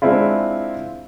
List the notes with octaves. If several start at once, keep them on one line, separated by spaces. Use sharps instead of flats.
G#3 C4 D4 E4 F4